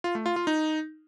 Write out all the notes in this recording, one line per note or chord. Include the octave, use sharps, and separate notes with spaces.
F4
A3
F4
F4
D#4